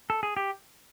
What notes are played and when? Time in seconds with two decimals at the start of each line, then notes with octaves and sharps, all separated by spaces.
0.10 A4
0.23 G#4
0.37 G4